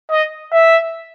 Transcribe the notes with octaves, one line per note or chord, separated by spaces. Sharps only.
D#5
E5